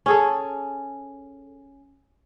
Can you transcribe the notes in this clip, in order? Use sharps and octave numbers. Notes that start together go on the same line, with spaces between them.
C#4 G#4 A4